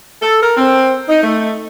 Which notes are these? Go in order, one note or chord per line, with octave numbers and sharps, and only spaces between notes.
A4
A#4
C4
D#4
A3